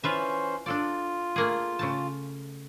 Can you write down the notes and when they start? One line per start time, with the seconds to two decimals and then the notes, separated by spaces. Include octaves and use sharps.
0.04 E3 C#4 F4 B4 C5 E5
0.66 D4 F4 A4 D5
1.36 A3 A#3 G#4
1.79 C#3 A3 A5